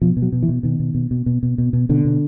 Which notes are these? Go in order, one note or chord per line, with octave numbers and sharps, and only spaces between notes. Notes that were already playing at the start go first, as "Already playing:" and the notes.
B2 F3
B2
F#3
B2
E3
B2
B2 D#3
B2
B2
B2
B2
B2
B2
B2
B2 D3
B2